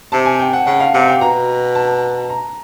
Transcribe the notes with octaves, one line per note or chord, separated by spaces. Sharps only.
C3 A5
G#5
G5
F#5
C#3 F#5
F5
C3 F#5
G5
B2 A#5
A5
A#5